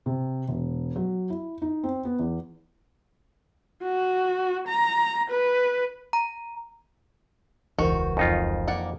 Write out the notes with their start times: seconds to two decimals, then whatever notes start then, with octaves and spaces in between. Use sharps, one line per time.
0.06 C3
0.48 E1
0.96 F#3
1.30 E4
1.62 D#4
1.83 C4
2.05 B3
2.19 E2
3.82 F#4
4.68 A#5
5.30 B4
6.13 A#5
7.78 E1 C#2 D#3 E3 F#4 A#4 C5
8.17 F2 D#4 F4
8.68 A#3 D5 F#5